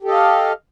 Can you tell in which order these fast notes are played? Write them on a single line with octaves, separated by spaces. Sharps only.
G4 A4 D#5 F5